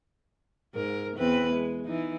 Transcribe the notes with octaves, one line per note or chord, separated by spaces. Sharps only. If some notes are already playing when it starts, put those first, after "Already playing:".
G#2 A#4
E2 C4 B4
G#3
E3 D#4